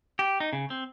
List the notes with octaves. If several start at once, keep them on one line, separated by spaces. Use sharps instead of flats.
G4
D#4
C#3
C4